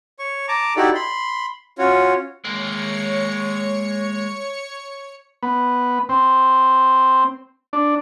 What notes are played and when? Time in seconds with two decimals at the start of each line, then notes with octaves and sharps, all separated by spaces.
0.19 C#5 C#6
0.48 A5 A#5 D6
0.76 D#4 E4 F#4 G4 A4 D5
0.95 B5 C6
1.78 C#4 F4 F#4 C#5
2.44 G#3 A#3 C#5 C#7
5.43 B3
6.09 C4
7.73 D4